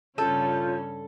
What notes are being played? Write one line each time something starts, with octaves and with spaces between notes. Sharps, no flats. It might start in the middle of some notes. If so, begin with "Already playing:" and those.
G2 C#3 C#4 F4 A4 C#5 G6